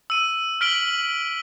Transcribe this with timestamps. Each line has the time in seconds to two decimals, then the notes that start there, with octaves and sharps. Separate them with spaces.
0.10 E6 D#7
0.61 F6 B6 D7 F#7 G7